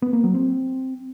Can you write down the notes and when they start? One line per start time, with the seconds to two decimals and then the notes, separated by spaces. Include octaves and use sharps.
0.02 B3
0.13 A#3
0.24 F#3
0.35 C4